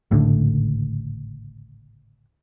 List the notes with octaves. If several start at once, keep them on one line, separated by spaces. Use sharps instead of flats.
G#1 C#2 A2 D3